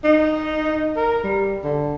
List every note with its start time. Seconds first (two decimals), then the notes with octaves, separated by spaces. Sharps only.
0.04 D#4
0.96 A#4
1.24 G3
1.63 D3